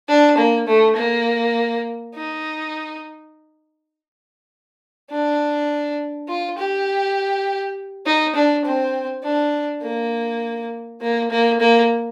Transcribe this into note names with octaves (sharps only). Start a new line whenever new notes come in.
D4
A#3
A3
A#3
D#4
D4
F4
G4
D#4
D4
C4
D4
A#3
A#3
A#3
A#3